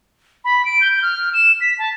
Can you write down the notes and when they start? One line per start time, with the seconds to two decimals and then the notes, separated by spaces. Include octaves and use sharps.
0.45 B5
0.65 D7
0.81 G6
1.02 F6
1.34 E7
1.61 B6
1.78 A5